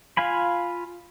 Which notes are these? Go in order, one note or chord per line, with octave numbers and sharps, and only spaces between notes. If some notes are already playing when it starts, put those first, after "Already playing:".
F4 F5 G#5 B5